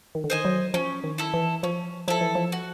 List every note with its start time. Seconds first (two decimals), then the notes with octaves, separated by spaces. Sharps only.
0.15 D#3
0.24 D3
0.30 D#3 C5 D#5 G#5
0.45 F#3
0.74 F3 C#4
1.04 D#3
1.18 E4 A4
1.34 E3
1.63 F3 C#4
2.08 F3 E4 A4
2.21 E3
2.35 F3
2.52 F#4